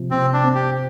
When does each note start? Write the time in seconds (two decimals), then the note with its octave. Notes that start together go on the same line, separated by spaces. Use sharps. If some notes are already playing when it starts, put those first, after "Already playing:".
Already playing: C3 F3
0.11 C3 C4
0.33 D4
0.44 C4
0.55 G4